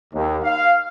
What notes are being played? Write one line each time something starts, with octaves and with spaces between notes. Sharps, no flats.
D#2
F5